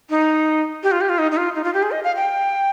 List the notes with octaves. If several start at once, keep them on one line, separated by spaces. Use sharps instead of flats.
D#4
G4
F4
G4
F4
D#4
D#4
F4
D#4
F4
G4
G#4
D#5
F5
G5